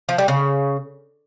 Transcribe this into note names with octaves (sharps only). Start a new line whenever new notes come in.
F3
G3
C#3